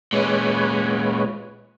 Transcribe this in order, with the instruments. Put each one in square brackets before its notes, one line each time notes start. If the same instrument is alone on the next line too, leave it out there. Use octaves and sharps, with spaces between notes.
[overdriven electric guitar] A#2 C#4 [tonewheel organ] G#3 B4 C#5